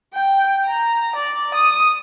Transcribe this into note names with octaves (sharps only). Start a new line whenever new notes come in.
G5
A#5
D5
D#6